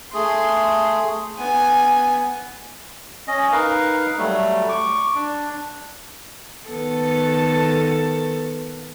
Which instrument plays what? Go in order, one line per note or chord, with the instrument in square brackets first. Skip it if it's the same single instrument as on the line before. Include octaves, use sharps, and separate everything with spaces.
[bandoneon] A3 G#4 [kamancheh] C6
[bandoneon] B3 [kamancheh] G#5
[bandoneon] C#4 D#5
D#4 A#4 B4 F5
F#3 G3 A3
C#6 D6
D4
[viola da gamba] D#3 B3 A4